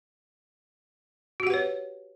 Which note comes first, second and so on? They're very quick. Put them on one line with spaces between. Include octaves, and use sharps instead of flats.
F#4 G4 F#5 B4 C#5